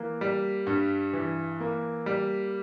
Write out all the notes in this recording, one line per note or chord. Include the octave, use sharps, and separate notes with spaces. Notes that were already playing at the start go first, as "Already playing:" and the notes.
Already playing: E3 A#3
G3
G2
E3
A#3
G3